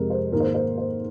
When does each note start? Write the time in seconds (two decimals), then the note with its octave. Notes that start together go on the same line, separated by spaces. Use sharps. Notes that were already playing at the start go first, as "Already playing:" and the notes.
Already playing: F2 C3 G#3 C4 A#4
0.10 C5
0.32 G#2 D#3 A#3 A#4
0.40 C5
0.47 A#4
0.54 C5
0.78 C5